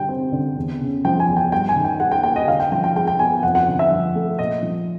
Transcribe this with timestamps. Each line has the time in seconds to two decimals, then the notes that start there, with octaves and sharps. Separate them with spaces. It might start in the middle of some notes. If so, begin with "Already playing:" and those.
Already playing: D3 G3 G5
0.09 C4
0.32 D3
0.57 E2
0.81 C#3
1.05 F3 G5
1.20 G#5
1.28 E2
1.37 G5
1.52 G2 G5
1.69 G#5
1.76 D#3
1.84 G5
2.00 G3 F#5
2.11 G5
2.23 A#3 G5
2.36 D#5
2.47 D3 F5
2.60 G5
2.72 F3 G5
2.84 G5
2.96 G#3 G5
3.07 G5
3.19 B3 G#5
3.43 F2 F#5
3.55 F#5
3.68 D3
3.79 E5
3.92 F3
4.15 A3
4.39 A#2 D#5
4.63 F3